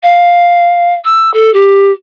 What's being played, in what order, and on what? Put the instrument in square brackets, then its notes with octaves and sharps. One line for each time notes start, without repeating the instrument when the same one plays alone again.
[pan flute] F5
E6
A4
G4